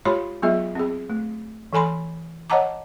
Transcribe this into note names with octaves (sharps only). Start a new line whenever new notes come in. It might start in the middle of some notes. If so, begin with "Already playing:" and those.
G#3 F4 G4 C#5 B5 C6
F#3 G#3 B3 F4 G#4 E5
C4 G#4
A3
E3 A4 G#5 B5 C6
C#5 D#5 F#5 A5 A#5 D6